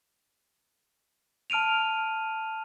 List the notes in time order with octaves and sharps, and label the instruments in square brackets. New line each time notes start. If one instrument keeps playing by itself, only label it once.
[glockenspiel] A5 F6 D7 D#7 F7